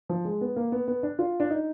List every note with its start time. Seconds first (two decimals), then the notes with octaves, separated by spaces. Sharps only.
0.09 F3
0.25 G#3
0.41 B3
0.56 A#3
0.72 B3
0.88 B3
1.03 D4
1.19 F4
1.40 D4
1.50 D#4